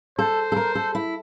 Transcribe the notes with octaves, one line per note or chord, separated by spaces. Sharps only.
A4 C5
A4
A#4
A4
E4